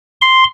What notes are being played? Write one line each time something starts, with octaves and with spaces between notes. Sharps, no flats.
C6